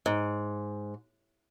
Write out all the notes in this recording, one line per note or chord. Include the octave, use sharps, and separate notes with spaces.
G#2